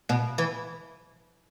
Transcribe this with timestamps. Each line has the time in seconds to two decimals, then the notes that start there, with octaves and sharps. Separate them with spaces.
0.09 B2
0.38 E3